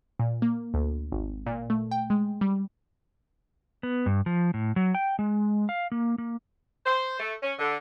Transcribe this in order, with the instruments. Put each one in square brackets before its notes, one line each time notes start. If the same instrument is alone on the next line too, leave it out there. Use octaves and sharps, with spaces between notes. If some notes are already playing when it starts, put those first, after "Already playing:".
[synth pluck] A#2
A#3
D2
G#1
A#2
A3
G5
G#3
G3
[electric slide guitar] B3
G2
F3
A2
F#3
G5
G#3
F5
A#3
A#3
[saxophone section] C5
A3
C#4
D3